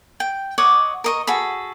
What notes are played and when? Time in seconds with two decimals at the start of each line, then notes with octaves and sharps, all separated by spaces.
0.20 G5
0.58 C#5 D#5 F#5 D6
1.04 A#4 D#5 C#6
1.27 F#4 G#4 A4 B5